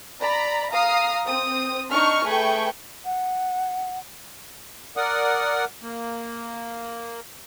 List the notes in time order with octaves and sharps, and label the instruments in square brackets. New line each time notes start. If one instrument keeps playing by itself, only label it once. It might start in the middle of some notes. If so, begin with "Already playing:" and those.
[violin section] D5 A#5 B5
F5 A#5 D#6 C7
C4 D#6
D4 D#4 C#6 F6
A3 G#4 B4 G5 C#6
[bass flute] F#5
[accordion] A#4 D5 F#5 D#6
A#3